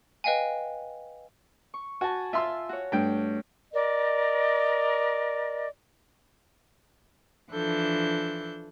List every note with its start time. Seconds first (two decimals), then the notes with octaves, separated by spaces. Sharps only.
0.24 B4 D#5 F5 G5 G#5
1.74 C#6
2.01 F#4 G#5 A5
2.33 F4 E5 C6 E6
2.69 F#4 C#5
2.92 G2 A3 G5
3.74 A#4 D5 D#5
7.51 E3 F3 D4 A4 F#6 G6